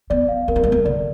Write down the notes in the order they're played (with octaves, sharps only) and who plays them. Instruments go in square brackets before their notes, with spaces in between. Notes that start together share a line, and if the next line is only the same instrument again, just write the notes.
[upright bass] B3 [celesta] D5
[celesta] F5
[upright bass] B3 [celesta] A#4
[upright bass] A#3
G#3
[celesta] A#4
[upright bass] A#3
[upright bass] D3 [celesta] D5